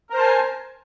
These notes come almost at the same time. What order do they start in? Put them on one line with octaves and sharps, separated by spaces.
A#4 C5 A5 G#5